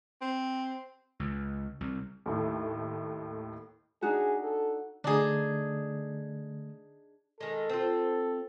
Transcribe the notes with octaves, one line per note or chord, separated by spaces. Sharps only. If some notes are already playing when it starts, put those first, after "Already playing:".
C4
C#2
C2
D#2 A2 A3
D4 D#4 F#4 G#4
A4
D3 A3 D4 D#4 G#4
D#3 G#3 A4
C4 F4